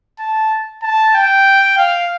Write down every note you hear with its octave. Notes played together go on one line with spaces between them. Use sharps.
A5
A5
G5
F5